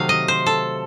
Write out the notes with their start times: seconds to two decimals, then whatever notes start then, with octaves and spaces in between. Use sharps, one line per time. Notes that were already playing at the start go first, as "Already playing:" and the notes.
Already playing: C3 D#3 F#3 A3 F5
0.09 D#5
0.28 C5
0.46 A4